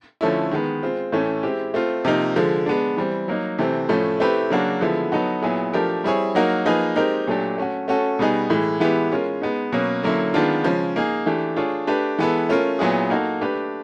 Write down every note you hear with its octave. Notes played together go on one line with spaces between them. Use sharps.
D3 F3 A3 C#4 E4
D#3 G#3 B3
G#3 C4 F4
A2 E3 A3 C#4
G#3 C4 E4 G4
A3 C4 F4
C3 F3 A#3 D#4
D3 F3 G#3
G#3 B3 D4
E3 G3 C4
F#3 A#3 D#4
C3 E3 A3 C4
A2 F3 A3 C#4
A3 C4 E4 G4 B4
C#3 F#3 A#3 D4 F#4
D3 F3 G#3 B3 E4
F#3 B3 D#4 F#4 A4
A#2 F#3 B3 E4 G#4
F3 A3 D4 G4 A#4
G3 C4 E4 G#4 C#5
F#3 A#3 D#4 F#4 A#4
F3 A#3 D#4 G#4 B4
G#3 C4 D#4 G4 A#4
A#2 F#3 A3 D4 G4
A3 C#4 F#4
A3 C#4 F#4 A4
B2 G3 B3 D#4 G#4
A2 E3 G#3
E3 G#3 B3 E4 G4
G#3 C#4 F4 A#4
G#3 B3 D#4
B2 F#3 A#3 C#4
D3 F#3 A#3 C#4 E4
D#3 G#3 B3 D4 F4
C#3 F3 G#3 C#4
A#3 D#4 G#4
E3 A3 D4 G4
A3 D4 F4 G#4 C#5
A3 D4 G4 B4
E3 G#3 B3 E4 A4
A3 C#4 F4 A#4
A#2 F#3 B3 E4 G#4
A#3 D#4 F#4 A4
A3 D4 G4 B4